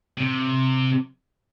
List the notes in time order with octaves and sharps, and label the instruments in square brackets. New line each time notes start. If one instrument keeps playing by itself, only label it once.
[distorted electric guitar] C3